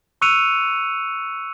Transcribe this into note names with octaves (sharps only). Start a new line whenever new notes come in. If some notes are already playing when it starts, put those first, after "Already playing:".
C#6 E6 F#6 C#7 D#7 F7